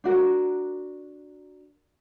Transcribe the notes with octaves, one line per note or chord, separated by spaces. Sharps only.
D4 F#4 A#4